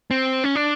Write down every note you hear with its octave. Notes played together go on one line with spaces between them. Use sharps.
C4
C#4
D4